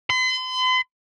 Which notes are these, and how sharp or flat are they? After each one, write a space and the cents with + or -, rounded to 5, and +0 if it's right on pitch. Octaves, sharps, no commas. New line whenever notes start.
C6 -45